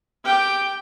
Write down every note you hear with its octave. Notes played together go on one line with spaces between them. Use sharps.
G4 G5